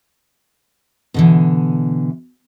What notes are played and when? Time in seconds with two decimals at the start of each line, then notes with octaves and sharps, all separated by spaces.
1.14 B2 D3 E3